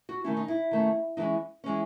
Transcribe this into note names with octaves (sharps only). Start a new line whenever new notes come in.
F#4
D#3 A3 C#4 E4
D#4
E4
D#3 A3 C#4
E3 G#3 C#4 D#4
E3 G#3 C#4